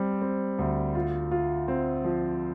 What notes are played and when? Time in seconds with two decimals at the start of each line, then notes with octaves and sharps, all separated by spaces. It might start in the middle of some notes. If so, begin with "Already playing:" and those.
Already playing: G3 C4
0.22 C4
0.59 D2
0.95 F4
1.31 F4
1.68 C4
2.04 F3